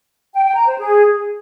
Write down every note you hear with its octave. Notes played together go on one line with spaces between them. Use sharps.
G5
G5
A#5
C5
G#4